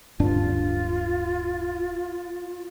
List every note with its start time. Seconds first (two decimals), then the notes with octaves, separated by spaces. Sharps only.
0.20 D1 G2 D4 F4